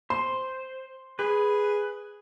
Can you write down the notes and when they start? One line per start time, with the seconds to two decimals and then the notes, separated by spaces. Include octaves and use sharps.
0.10 C5 C6
1.19 G#4 B4